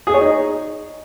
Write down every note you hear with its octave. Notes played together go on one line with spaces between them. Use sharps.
G#4
C#5
D#4